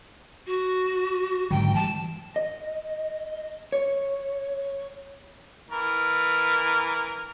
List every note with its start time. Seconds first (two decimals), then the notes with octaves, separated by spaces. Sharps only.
0.47 F#4
1.51 G#2 D3 F#3 G5
1.75 E3 G3 A5
2.36 D#5
3.72 C#5
5.71 E3 A#4